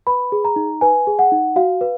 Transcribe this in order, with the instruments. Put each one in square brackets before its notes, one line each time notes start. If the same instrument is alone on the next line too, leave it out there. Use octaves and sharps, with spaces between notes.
[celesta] B4 B5
G#4
A#5
D#4
B4 G#5
G#4
F#5
D#4
F#4 F5
B4